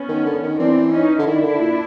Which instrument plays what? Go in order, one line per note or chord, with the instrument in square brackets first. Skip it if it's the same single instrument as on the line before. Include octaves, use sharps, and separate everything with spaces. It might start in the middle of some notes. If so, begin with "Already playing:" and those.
Already playing: [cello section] B3 C#4
[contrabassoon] D#3
D3
D#3
[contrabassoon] E3 [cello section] C4 D4
[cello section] C#4 D#4
[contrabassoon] D3
[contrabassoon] D#3 [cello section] D4 E4
[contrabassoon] D3
A#2